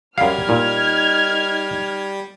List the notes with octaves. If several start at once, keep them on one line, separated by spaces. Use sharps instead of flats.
F#2 G3 F5 F6 G#6
A#2 D#4